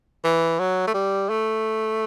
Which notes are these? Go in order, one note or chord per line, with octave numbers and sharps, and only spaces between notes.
E3
F#3
A3
G3
A3